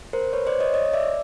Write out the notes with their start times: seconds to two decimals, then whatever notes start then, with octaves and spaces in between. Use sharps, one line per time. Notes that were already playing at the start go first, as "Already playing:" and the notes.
0.13 A#4 C5
0.33 B4 C#5
0.47 C5 D5
0.60 C#5 D#5
0.74 C#5 D#5
0.94 D5 E5